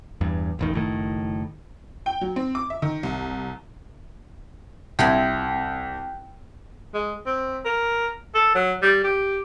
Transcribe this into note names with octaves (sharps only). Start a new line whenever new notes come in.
E2 G2
E1 A1 D#3
F#1 A2 D#3
G5
F#3
C4
D6
E5
D#3
C2
C2 C4 E4 F4 G5
G#3
C4
A#4
A4
F#3
G3
G4